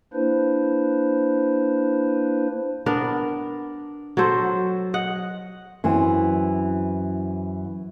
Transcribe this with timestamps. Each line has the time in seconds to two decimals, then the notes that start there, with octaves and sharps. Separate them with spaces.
0.13 A#3 D4 E4 B4 C5
2.86 B3 D4 A#4
4.17 F#3 A4 C5
4.94 D#5 F#5
5.84 F#2 E3 C4